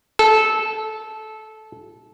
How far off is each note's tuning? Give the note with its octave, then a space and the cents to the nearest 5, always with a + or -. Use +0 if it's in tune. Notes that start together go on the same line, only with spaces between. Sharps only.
A4 -15